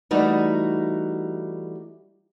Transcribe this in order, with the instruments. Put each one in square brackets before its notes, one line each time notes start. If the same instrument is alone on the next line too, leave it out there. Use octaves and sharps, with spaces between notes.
[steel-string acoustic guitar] E3 G3 A3 D#4 F#4